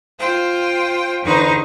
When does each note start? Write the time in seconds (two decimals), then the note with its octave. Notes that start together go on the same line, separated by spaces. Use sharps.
0.18 F4 C5 G5
1.22 E2 D3 D#4 B4 C5 C#6